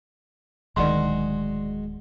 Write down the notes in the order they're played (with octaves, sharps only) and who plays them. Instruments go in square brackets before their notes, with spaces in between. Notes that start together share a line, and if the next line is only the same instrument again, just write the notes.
[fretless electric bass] D1 D2 D#3 [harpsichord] G#3 F#4 [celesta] D5 C6